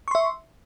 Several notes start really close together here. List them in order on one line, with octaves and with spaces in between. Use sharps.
C#6 C6 E5